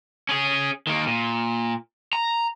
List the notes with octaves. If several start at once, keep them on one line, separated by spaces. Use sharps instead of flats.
C#4 G#4
D#3 A#3
A#2
A#5